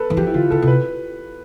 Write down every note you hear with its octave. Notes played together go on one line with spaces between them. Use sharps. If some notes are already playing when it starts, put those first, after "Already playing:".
Already playing: A4 B4
E3
F3 G4
E4
D3 F4
D3 A4
C3
B4